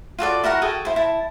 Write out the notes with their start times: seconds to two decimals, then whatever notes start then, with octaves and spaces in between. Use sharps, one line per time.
0.19 F4 F#4 A4 D5
0.44 E4 F#4 A#4 F#5
0.62 F#4 G#4 A4 G5
0.85 E4 C5
0.96 E4 A5